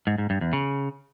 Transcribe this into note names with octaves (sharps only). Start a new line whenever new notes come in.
G#2
G#2
G2
E2
C#3